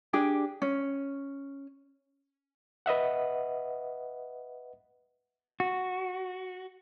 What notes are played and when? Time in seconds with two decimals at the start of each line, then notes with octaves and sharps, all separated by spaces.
0.13 D4 G4 G#4
0.62 C#4
2.86 B4 D#5 E5 F#5
5.60 F#4